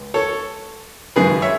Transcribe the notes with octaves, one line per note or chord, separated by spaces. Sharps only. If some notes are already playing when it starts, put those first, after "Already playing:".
Already playing: C#2
A4 C#5
G#1 F#2 C#3 G#3 G#4 B4
C#5 E5